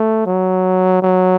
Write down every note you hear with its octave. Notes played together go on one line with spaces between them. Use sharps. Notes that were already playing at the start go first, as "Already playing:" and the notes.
Already playing: A3
F#3
F#3